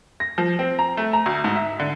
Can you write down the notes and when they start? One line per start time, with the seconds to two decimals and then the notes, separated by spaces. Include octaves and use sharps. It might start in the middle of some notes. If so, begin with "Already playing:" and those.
0.20 A#6
0.38 F3
0.59 C4
0.79 A#5
0.97 A3
1.13 A#5
1.26 D2
1.44 G#2
1.56 E5
1.80 D3